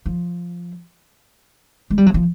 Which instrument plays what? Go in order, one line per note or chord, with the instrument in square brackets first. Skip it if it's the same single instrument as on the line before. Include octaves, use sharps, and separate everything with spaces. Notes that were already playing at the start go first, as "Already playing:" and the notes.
[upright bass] F3
G#3
G3
F#3
F3